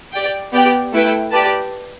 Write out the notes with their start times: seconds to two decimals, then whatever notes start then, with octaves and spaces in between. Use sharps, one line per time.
0.12 G4 D5 G5
0.52 B3 G4 D5 G5
0.93 A3 E4 B4 G5
1.32 G4 B4 D5 A5